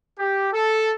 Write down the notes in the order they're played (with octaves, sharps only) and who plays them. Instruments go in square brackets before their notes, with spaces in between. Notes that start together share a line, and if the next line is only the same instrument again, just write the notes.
[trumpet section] G4
A4